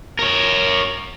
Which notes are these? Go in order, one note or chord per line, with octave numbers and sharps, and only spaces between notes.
A#4 C#5